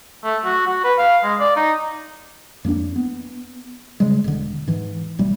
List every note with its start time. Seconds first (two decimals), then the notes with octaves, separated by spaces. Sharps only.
0.24 A3
0.45 F#4
0.67 F#4
0.84 B4
0.99 F5
1.24 G#3
1.40 D5
1.56 D#4
2.65 F2 A#3 B3 D4
2.96 B3
4.00 C#3 G3 G#3
4.24 E1 D3
4.68 G#2 E3
5.19 G#1 B2 G3 A3